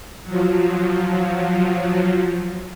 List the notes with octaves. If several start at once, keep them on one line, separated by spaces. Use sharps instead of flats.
F3 F#3